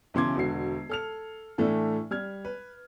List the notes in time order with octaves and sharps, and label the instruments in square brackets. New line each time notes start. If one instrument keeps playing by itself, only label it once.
[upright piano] B1 C#3 E3 C6 D6 G#6
E1 D3 F#4 C7
A4 F6 F7
A2 E3 A3 D4
G3 F6 G#6
B4